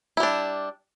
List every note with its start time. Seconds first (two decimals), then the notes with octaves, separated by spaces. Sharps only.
0.17 E4
0.20 G3
0.23 D4